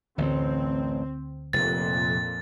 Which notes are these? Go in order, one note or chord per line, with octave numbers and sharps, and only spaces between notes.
A1 D2 C4
F1 F2 A#2 A6